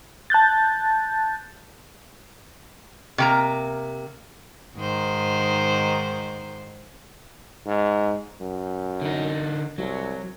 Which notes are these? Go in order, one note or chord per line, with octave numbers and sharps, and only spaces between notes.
A5 F#6 G6 A6
C3 A#3 A#5
G#2 D#3 C5
G#2
F#2
D3 D#4
C2 F#3